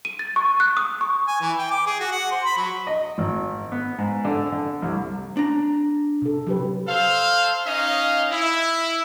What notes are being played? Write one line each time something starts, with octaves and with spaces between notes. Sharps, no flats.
D#7
A6
C#6
F#6
D#6
C#6
G#5
E3
G5
D6
G#4
F#4
F#5
C5
B5
F#3
D#5
G#1
B3
G#2
D3
D3
C2
D4 A#5
C3 A4
F#3 G4 B4
A4 C5 F5
C#4 D#4 D#5 F5
E4